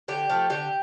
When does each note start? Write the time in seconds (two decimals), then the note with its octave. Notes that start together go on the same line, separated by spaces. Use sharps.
0.08 D3 G4
0.29 F3 A3
0.50 D3 G4